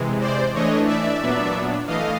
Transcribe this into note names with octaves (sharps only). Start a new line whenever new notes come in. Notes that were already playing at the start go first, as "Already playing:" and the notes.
Already playing: C3 E3 G#3
C5 D5
E3 A3 D4 C#5 D#5
D5 E5
A#2 F#3 B3 D4
E3 A3 D#5 F5